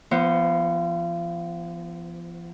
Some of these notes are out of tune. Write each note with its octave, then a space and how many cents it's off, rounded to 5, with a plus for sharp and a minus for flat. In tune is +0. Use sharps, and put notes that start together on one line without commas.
F3 -35 B3 +0 C5 +0